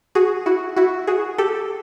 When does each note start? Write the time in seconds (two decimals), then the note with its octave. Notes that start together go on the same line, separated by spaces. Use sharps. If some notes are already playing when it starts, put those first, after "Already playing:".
0.15 F#4 G#4
0.46 E4 F#4
0.77 E4 F#4
1.07 F#4 G#4
1.38 G4 A4